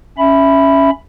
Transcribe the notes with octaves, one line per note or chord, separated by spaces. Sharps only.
C#4 E5 B5